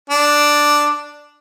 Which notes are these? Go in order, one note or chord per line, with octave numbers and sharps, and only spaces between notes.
D4